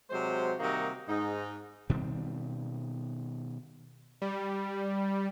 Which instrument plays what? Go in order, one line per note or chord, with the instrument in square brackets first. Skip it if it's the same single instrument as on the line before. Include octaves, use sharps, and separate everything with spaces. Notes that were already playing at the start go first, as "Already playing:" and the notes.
[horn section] C3 F#3 G#3 C5
C3 D#3 G3 A#3 D#4 F#4
G#2 D#4
[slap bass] B2 D#3 G3 C4
[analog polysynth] G3